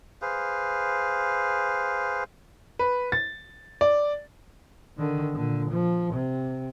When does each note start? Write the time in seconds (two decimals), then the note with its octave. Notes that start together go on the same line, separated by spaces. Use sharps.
0.22 G#4 B4 C5 F5
2.79 B4
3.12 A6
3.81 D5
4.98 D3 D#3
5.34 A#2 D3
5.70 F3
6.14 C3